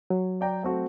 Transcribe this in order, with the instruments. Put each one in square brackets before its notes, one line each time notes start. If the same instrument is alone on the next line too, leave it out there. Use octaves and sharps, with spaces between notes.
[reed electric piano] F#3
[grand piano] D5 G5 A#5
A3 C4 F#4